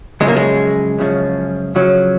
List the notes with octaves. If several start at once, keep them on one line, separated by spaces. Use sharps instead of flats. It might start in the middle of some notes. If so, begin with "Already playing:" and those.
F#2 C#3 F3 G#3
A#3
G#3
F#2 C#3 F3
F#2 C#3 F3 F#3